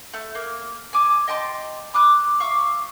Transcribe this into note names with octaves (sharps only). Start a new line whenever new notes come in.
A3
A#3
G#5 D6 D#6
D#5 G5 A5 C6
B5 D6 D#6 F#6
E5 F5 C#6 D6